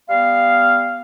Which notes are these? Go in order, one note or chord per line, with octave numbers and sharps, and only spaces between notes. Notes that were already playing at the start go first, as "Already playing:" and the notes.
G3 B3 F5